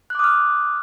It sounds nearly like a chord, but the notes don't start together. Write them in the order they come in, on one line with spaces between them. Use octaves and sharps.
F#6 D6 D#6 F6